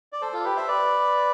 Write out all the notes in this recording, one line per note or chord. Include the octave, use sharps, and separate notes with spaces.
D5
A4 C5
F4 A4
G4 B4
C5 E5
B4 D5